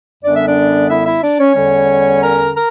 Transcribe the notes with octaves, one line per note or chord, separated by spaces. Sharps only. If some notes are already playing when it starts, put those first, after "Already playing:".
F#2 D3 G3 B3 D4 D5
E5
D4 D5
E4 E5
E4 E5
D4 D5
C#4 C#5
E2 D3 G3 C#4
A#4 A#5
A#4 A#5